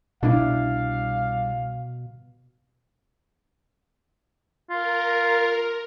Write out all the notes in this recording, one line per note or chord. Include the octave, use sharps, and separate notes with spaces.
C2 B2 G3 D4 E4 F5
F4 A#4